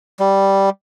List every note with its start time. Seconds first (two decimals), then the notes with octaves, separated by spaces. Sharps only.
0.20 G3